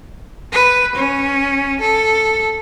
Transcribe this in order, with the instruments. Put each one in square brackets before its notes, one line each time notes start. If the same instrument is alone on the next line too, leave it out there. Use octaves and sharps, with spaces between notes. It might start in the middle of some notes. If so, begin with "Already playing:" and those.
[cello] B4
C#4
A4